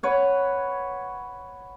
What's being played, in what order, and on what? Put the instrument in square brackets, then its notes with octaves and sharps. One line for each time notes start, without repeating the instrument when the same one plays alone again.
[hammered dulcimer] B4 C#5 F#5